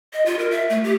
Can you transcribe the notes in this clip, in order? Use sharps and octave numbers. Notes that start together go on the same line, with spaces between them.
D#5
F4
A#4
E5
A3
G4